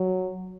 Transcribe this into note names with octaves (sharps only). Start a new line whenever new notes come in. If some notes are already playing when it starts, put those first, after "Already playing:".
Already playing: F#3